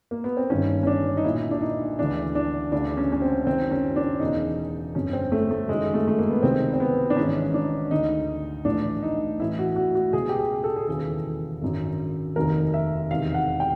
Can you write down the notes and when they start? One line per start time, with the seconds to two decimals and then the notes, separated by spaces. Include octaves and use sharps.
0.11 A#3
0.24 B3
0.37 C4
0.50 G1 G2 D#3 C#4
0.83 C#4
0.87 D4
1.17 D#4
1.24 B1 A#2 E4
1.51 D4
1.61 D#4
1.98 D2 C#3 E3 D4
2.35 D4
2.72 D2 C#3 E3 D4
2.97 C#4
3.12 C#4
3.22 C4
3.46 F#1 F#2 D#3 C4
3.71 C#4
3.96 D4
4.20 E1 E2 C#3 E3 D#4
4.95 G1 F2 D3 C#4
5.13 C4
5.32 A3
5.51 A3
5.69 F#1 F#2 D#3 G#3
5.94 A3
6.08 A3
6.19 A#3
6.31 B3
6.42 C#2 C3 D#3 C4
6.73 C4
6.80 B3
7.10 D4
7.17 G#1 G#2 E3 C#4
7.54 D4
7.91 D2 D3 D#4
8.65 A#1 A2 E3 D4
9.03 D#4
9.39 A1 A2 E3 E4
9.59 F#4
9.76 F#4
9.95 F#4
10.13 C#2 B2 G#4
10.29 G4
10.39 G#4
10.64 A4
10.76 G#4
10.88 E1 D#2 C#3 E3 A4
11.62 G#1 F#2 D3
12.36 F1 D#2 D#3 A#4
12.74 E5
13.10 E1 E2 C3 D#3 F5
13.34 F#5
13.60 G5